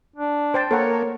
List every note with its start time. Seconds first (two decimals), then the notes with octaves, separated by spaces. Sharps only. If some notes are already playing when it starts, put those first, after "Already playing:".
0.16 D4
0.54 C5 G5 A5
0.71 A#3 A4 A#4 C#5 F#5